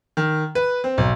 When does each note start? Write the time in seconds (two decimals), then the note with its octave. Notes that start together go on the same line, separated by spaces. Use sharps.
0.17 D#3
0.55 B4
0.84 C4
0.98 B1